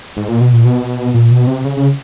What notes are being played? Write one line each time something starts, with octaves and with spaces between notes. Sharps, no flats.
G#2
A#2
B2
A#2
B2
A#2
B2
C3
C#3
C#3